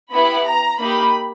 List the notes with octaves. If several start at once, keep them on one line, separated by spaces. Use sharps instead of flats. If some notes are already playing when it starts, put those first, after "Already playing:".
B3 E4 G4 B5
A#5
A#3 D#4 G4 B5